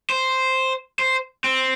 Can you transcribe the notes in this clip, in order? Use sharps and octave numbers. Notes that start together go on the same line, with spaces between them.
C5
C5
C4